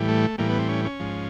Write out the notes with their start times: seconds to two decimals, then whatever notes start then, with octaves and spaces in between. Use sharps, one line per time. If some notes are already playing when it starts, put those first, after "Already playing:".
Already playing: A2 E3 G3
0.08 A3
0.38 A2 E3 G3 A#3
0.49 B3
0.59 C4
0.69 C#4
0.85 C#4
1.00 G#2 F3